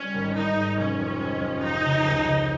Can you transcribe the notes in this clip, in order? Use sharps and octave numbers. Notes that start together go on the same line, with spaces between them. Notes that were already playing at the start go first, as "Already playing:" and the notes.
Already playing: G3 C#4
G#1
G#1 D#4
G#2
F1 C#4
F2
G#3
F2
F3 D#4
C#3
C#2
C#3